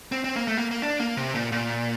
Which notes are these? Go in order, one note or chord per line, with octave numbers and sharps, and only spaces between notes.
C4
C4
A#3
A3
A#3
A#3
D4
A#3
C3
A#2
A#2